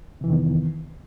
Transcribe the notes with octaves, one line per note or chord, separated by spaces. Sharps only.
F2 C3 D#3 E3 B3